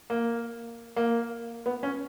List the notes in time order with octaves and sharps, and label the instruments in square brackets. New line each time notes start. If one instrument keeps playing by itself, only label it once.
[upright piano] A#3
A#3
B3
C#4